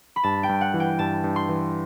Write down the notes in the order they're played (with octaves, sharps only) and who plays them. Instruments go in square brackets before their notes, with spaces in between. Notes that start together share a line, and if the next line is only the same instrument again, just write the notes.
[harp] B5
[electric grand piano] G2 [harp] A5
[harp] G5
[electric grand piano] G2
[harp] F#5
[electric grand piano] E3
[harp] G5
[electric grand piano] G2 [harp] A5
[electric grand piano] G2
[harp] C6
[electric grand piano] E3